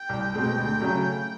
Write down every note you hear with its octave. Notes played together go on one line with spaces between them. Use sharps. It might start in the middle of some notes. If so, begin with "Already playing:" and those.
Already playing: G5
C2
B2 G#3 C4
D2
C#3 F#3 A3 C#4